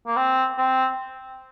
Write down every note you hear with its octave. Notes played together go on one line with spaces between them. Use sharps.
A#3
C4
C4